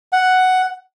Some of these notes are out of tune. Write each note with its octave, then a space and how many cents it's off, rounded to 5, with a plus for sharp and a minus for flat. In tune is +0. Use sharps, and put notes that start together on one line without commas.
F#5 +5